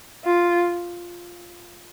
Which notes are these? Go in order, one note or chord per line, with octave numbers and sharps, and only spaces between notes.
F4